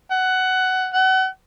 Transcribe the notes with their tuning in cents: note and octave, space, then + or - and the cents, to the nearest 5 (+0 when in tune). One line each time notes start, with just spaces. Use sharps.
F#5 +15
F#5 +35